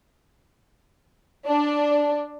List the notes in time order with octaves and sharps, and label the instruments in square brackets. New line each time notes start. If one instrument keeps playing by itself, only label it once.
[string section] D4